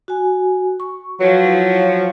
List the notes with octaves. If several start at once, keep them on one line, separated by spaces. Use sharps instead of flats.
F#4 G#5
C#6
F3 F#3 B4
E4 F5